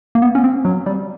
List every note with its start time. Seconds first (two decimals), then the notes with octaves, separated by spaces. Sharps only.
0.15 A#3
0.22 B3
0.35 C#4
0.44 C4
0.65 F#3
0.86 G3